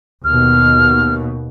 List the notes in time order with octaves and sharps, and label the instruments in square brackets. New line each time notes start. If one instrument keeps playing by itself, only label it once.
[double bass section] D#2 B2 [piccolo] F6